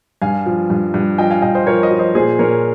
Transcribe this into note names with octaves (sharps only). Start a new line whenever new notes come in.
G2 F5 G#5
F3
G2
G2
F3 D#5 G5
F5 G#5
G2 D#5 G5
C5 D#5
F3 A#4 C#5
C5 D#5
F3
C5 D#5
A#2 G#4 C5
A#2 A#4 C#5